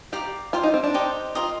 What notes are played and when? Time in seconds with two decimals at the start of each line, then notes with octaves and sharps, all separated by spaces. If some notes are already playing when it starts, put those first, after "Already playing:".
0.12 G4 D5 F5 A#5 D6
0.53 F4 G4 C5 F5
0.63 D#4
0.74 C4
0.84 D4
0.94 D#4 G4 C5
1.35 F4 A#4 D#5 A#5